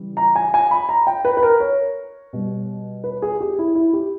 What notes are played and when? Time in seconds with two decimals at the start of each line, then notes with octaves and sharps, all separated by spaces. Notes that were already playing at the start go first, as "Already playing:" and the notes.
Already playing: C#3 E3 G3
0.17 A#5
0.36 G#5
0.54 G#5
0.71 B5
0.89 A#5
1.07 G5
1.25 B4
1.37 B4
1.43 A#4
1.60 C#5
2.33 B2 G3
3.04 B4
3.22 G#4
3.40 G4
3.59 E4
3.75 E4
3.93 G4